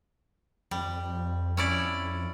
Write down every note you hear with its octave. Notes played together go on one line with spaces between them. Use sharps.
F2 G3
C#4 E4 D5